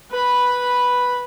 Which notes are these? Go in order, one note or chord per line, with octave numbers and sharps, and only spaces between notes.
B4 B5